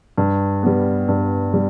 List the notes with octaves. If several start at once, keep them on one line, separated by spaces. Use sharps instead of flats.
G2
G3 B3
G2
G3